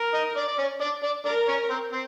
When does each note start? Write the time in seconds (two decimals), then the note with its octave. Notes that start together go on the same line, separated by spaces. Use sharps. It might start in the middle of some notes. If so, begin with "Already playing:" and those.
Already playing: A#4
0.14 D#4 D#5
0.36 D4 D5
0.48 D5
0.58 C#4 C#5
0.81 D4 D5
1.03 D4 D5
1.25 D4 A#4 D5
1.48 C#4 C#5
1.70 C4 C5
1.92 C4 C5